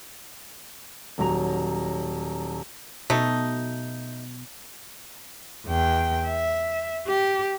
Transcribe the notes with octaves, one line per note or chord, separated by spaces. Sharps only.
D#1 F#3 A#5 F7
B2 A3 D#4
E2 G5
E5
G4